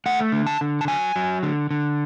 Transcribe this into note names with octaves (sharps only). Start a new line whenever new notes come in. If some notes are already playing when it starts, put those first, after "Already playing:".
A3 F#5
D3
A5
D3
A5
F#3 G#5
F#3
D3
D3